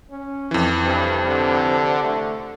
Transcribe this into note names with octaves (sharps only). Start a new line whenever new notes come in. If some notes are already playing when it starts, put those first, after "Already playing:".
C#4
F2 E3
G2 C3
D3
A3